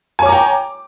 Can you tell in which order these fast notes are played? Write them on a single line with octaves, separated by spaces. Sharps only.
G#5 C#5 D6 A#5 G5